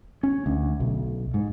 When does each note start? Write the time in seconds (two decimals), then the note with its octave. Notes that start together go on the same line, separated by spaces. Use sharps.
0.23 C#4
0.46 D2
0.80 B1
1.34 G#2